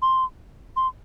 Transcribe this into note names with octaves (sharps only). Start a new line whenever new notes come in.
C6
C6